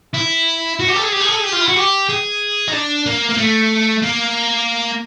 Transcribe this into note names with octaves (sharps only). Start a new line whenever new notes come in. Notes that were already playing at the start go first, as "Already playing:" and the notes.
E4
F#4
G4
A4
G#4
G4
G#4
A4
G#4
G4
F4
E4
F#4
G4
G#4
D#4
D4
A#3
A#3
A3
A#3